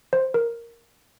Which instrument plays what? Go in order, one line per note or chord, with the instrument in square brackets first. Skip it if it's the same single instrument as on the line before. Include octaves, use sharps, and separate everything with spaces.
[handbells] C5
A#4